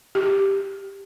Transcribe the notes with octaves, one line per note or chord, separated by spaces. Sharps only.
G4